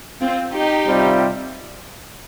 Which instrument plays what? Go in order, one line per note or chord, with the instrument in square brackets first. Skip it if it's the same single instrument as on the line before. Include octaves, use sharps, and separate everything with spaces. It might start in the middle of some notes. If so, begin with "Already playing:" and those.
[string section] C4 F4
D#4 G4
[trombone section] C3 G3 C4 F4